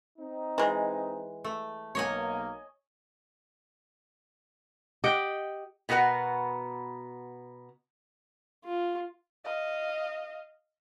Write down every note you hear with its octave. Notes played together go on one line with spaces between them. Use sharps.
C4 D#4
E3 G#3
A3
B1 A#3 C#5 D#5 G#5
G4 D#5 F#5 G5
B2 B3 F#4 A#4 F#5
F4
D#5 F5